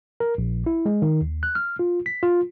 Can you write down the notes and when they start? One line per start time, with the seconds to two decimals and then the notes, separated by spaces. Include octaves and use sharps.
0.20 A#4
0.38 A#1
0.66 E4
0.86 G#3
1.02 D#3
1.21 D#2
1.43 F#6
1.55 F6
1.79 F4
2.06 B6
2.23 F4